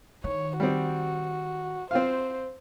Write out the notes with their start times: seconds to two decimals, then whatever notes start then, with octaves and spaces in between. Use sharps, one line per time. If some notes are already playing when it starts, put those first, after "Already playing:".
0.24 D#3 C#5
0.60 G3 C4 F#4
1.91 C4 F4 C5 F5